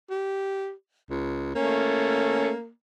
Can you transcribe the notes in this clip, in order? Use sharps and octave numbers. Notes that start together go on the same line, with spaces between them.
G4
C#2
A3 A#3 C#4